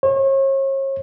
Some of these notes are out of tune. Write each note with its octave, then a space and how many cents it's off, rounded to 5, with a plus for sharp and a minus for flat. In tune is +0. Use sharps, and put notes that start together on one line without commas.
C#5 -40